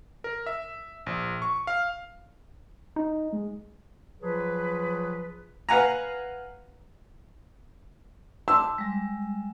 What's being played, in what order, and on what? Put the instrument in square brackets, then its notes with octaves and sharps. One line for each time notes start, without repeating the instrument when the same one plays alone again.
[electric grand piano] A#4
E5
A#1
C#6
F5
[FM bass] D#4
[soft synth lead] G#3
[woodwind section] F3 F#3 F4 G#4 B4
[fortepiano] B4 F5 F#5 G#5 A#5
[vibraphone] A5 C6 D6 [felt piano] E6
[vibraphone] G3 G#3